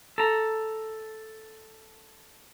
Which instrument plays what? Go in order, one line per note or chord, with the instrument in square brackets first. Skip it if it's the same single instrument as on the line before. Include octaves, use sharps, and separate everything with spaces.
[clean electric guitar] A4 A#5